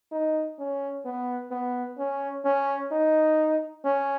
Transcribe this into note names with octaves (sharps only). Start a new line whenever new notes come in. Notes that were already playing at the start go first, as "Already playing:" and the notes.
D#4
C#4
B3
B3
C#4
C#4
D#4
C#4